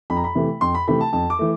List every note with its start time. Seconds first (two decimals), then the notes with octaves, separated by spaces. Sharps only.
0.10 F2 B5
0.17 A#5
0.24 B5
0.35 C3 E3 A3
0.61 F2 C6
0.75 B5
0.88 C3 E3 A3 B5
1.01 A5
1.13 F2 A5
1.30 D6
1.39 E3 A3